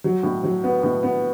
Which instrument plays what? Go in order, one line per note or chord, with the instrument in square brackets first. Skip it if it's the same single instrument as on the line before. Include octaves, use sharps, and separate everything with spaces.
[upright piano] F#3
A2
F#3
B3
A2
B3